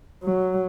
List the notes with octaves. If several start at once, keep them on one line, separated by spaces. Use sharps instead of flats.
F#3